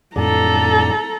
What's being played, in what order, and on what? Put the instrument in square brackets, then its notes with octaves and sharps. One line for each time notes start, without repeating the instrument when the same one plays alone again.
[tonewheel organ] F2 A2 D3 [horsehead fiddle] A4 A#5